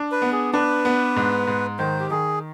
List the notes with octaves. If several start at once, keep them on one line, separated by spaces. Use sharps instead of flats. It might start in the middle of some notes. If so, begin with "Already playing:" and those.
Already playing: D4
B4
B3
G#4
D4 B4
B3
G#2
G#2
D#3 C5
G4
D#3 G#4